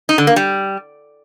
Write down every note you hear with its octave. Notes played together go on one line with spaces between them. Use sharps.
D#4
D3
A#3
G3